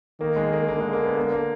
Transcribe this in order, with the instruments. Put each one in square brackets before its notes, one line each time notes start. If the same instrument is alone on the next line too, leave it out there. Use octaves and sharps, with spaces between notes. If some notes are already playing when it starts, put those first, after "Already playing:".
[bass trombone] D#3 [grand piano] A#3
[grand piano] G#3
A#3
[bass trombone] D3 [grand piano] A#3
[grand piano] G#3
A#3
B3
A#3
A#3